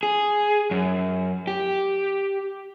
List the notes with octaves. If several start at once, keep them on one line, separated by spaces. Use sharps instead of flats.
G#4
F#2
G4